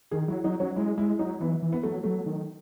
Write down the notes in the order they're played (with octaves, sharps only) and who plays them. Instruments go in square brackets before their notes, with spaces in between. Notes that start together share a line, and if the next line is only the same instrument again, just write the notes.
[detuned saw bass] D#3 [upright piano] G#4
[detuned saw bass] F#3 [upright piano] E4
[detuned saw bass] F#3 [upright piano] D#4
[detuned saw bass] F#3 [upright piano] C#4
[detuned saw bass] G#3 [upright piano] E4
[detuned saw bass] G#3 [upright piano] E4
[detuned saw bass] F#3 [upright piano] D#4
[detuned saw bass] E3 [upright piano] B3
[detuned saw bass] E3
[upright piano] B3
[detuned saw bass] F#3 [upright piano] A3
[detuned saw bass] F#3 [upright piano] A3
[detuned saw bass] D#3